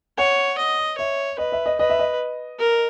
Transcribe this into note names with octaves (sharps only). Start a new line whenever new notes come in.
C#5 F#5
D#5
C#5 E5
B4 D#5
E5
D#5
B4 D#5
E5
D#5
A#4